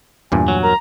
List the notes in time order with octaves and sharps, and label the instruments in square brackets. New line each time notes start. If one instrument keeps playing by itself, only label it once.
[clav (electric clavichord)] E2 G2 A#2 [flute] G#5
[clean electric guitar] F#3
[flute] A#4 [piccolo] A#5